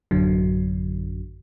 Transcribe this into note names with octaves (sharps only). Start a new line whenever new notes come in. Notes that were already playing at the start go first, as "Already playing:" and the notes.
A1 F#2 D3 F#3